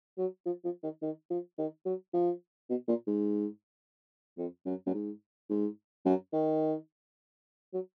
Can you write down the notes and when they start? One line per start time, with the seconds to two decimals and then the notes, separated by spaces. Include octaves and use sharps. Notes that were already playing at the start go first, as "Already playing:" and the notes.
0.18 F#3
0.46 F3
0.65 F3
0.83 D#3
1.02 D#3
1.30 F3
1.58 D#3
1.85 F#3
2.14 F3
2.70 B2
2.88 A#2
3.07 G#2
4.38 F2
4.66 F#2
4.86 F#2
4.94 G#2
5.50 G#2
6.06 F#2
6.33 D#3
7.74 F#3